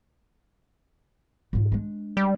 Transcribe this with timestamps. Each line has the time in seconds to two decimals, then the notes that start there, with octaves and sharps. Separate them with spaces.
1.53 G#2 F4
1.72 G#3 D4
2.17 G3